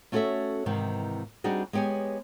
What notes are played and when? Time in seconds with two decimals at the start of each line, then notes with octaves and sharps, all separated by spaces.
0.12 A3 C#4 F#4 A4 C#5 E5
0.66 G#2 C3 D#3 E3
1.44 G3 C4 D4 D#4 F#4 G#4
1.73 G#3 B3 G4 C#5 G#5